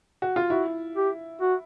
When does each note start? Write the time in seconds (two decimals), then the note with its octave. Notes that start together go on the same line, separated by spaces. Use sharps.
0.22 F#4
0.36 F4
0.50 E4 F#4
0.96 G4
1.41 F#4